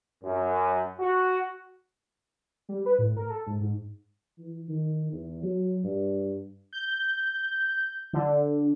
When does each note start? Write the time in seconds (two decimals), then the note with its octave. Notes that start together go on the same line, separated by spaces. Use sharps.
0.24 F#2
1.00 F#4
2.69 G3
2.86 B4
2.99 A2
3.17 A#4
3.30 A4
3.47 G#2
3.60 G#2
4.39 E3
4.69 D#3
5.12 E2
5.43 F#3
5.84 G2
6.73 G6
8.13 D3